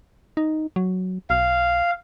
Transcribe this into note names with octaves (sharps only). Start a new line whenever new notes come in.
D#4
F#3
B1 F5